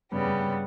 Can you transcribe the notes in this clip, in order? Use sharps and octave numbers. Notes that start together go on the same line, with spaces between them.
G2 C#3 G3 B3
G2
G2